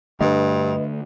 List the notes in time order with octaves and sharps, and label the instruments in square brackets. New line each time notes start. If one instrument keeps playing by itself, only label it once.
[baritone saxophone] G2 [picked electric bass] D3 A3 [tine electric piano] B4 D#5